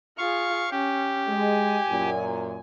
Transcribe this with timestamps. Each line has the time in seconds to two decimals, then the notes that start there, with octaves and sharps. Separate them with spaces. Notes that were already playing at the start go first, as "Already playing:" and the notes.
0.18 F4 G#4 F5 C#6
0.71 C#4 G4
1.28 G#3 G#5
1.89 F#2 A#2